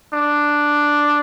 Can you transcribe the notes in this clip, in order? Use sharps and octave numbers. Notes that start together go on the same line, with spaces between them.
D4